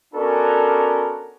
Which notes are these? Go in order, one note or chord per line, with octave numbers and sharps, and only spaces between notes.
B3 C#4 D4 F#4 A4 A#4